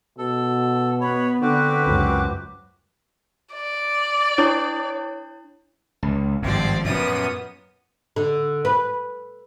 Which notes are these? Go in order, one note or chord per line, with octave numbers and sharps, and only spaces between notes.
B2 A4
B3 B4 C#5 B5
D3 C4 F#4 B4 D6 F#6
C#2 F#2
D5
D4 E4 C#5
C#2
G#1 G2 F3 C4 D5
F#2 A#2 B3 D#6
D3
B4